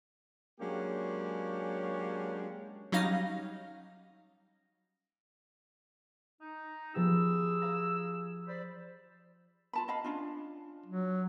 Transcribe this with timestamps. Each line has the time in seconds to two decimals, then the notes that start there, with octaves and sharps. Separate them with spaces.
0.61 F#3 G#3 A#3 C#4 D4 G4
2.92 F#3 G3 C#4 D#4 F5 A#6
6.41 D#4
6.95 F3 B3 G4 G#4 E6
7.62 F5 A#5
8.47 C5 D5 B5
9.73 F4 A5 B5
9.88 D#5 F5 B5
10.04 C#4 D4 F4
10.86 F#3